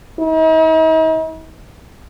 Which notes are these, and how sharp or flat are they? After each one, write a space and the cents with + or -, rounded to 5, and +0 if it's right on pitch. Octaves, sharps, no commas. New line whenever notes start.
D#4 +45